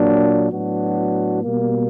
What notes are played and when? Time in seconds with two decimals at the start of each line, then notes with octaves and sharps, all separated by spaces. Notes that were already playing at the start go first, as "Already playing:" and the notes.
Already playing: A#2 F#3 A#3 D4
0.52 A2 F#3 B3 D4 F#4
1.44 B2 G3 A#3